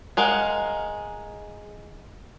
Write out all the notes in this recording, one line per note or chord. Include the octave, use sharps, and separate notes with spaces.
G#3 A#4 F5 F#5